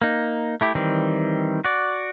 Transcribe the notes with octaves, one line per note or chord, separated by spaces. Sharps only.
A#3 D#4
A3 E4 G4
D#3 E3 G3 C4
F#4 D5